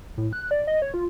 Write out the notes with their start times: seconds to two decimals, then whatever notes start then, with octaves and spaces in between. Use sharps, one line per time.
0.17 A2
0.33 F#6
0.51 D5
0.67 D#5
0.82 C#5
0.94 F4